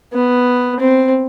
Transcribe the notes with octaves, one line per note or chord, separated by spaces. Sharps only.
B3
C4